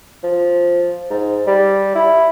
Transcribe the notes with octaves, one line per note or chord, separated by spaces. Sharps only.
F3
G#2
G3
E4